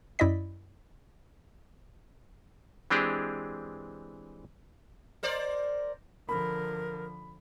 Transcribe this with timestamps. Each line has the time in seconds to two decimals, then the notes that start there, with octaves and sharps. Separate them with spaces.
0.19 F#2 E4 D5 D#5 B6
2.90 E3 G#3 C4 D4 G4 G#4
5.23 A#4 C5 D5
6.29 D3 F3 A#4 B5